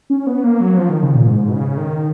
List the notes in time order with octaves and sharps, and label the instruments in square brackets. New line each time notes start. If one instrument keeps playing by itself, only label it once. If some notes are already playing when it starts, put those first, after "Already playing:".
[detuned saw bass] C#4
B3
A#3
F#3
F3
D#3
C#3
A#2
G#2
B2
C#3
D#3